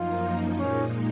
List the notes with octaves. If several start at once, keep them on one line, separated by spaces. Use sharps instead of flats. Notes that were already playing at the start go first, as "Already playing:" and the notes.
Already playing: F#2 F3 A#3 D#4 F4
A#2 G#3 C#4 D#4